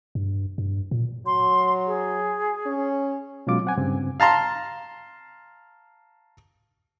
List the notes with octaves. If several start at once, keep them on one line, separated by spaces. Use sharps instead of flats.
G2
G2
A#2
F#3 C6
G#4
C#4
B2 F#3 G#3 C#4 F4 D6
C4 F#5 G#5
G2 C#3 C4
F5 A5 A#5 C6